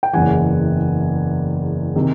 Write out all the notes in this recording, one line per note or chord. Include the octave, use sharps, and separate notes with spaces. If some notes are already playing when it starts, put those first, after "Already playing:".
G5
F#1 E2 C#3 E3 F#5 G#5
C3 D#3